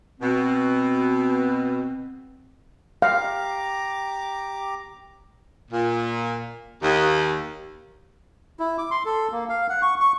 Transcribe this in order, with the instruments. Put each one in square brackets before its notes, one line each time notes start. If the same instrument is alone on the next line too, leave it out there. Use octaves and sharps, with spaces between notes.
[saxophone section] B2 [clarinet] C4
[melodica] G4 A#5 D6 [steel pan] F5
[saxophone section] A#2
D#2
[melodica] E4
D6
C6
A4
A#3
F5
F#5
C#6
C#6